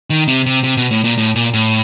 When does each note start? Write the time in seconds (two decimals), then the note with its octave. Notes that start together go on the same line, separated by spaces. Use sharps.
0.10 D#3
0.28 C3
0.46 C3
0.64 C3
0.77 B2
0.91 A2
1.04 A#2
1.18 A2
1.35 A#2
1.53 A2